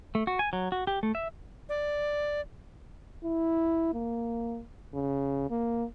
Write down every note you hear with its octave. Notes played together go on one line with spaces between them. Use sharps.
A3
F#4
G#5
F#3
F#4
G4
A3
E5
D5
E4
A#3
C#3
A#3